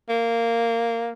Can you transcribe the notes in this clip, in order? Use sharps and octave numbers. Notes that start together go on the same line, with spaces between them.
A#3